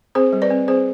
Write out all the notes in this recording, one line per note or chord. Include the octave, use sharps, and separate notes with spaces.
C4 G#4 C5
G3
B4 D5
C4
C4 G#4 C5